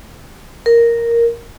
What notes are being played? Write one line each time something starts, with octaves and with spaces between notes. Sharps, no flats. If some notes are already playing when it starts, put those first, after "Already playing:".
A#4